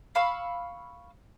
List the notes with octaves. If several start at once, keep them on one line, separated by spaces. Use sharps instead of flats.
F5 B5 C#6 E6